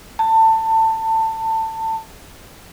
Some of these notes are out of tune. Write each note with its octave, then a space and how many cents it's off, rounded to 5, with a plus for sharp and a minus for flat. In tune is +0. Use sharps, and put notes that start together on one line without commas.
A5 +25